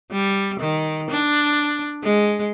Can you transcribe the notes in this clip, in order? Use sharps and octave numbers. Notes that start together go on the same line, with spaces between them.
G3
D#3
D4
G#3